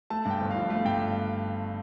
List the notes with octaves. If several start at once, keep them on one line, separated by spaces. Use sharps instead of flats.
A3 A5
G2
G5
G1
F5
F3
A3 F5
G2 G5